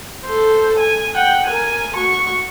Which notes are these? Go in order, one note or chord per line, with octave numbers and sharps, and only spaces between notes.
A4 C5
G#5
F#5 G5
A#4 G#5
F#4 C#6